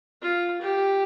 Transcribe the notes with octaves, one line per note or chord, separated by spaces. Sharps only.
F4
G4